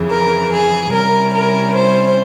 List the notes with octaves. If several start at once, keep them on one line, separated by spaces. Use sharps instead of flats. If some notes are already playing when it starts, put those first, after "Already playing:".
Already playing: F2 C#3 E3
A#4
G#4
C3 G3 C#4 E4 A#4
A#4
C5